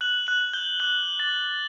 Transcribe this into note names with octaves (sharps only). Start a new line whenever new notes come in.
F#6 F#7
F#6 F#7
F#6
G6 G7
D6 F#6 F#7
D6 A6